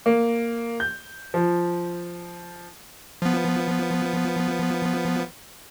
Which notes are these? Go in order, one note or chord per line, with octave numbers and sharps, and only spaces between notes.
A#3
G6
F3
F3 B3